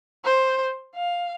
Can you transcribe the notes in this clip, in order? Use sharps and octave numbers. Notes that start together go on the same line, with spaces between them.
C5
F5